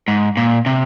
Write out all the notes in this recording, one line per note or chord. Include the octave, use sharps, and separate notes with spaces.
G#2
A#2
C3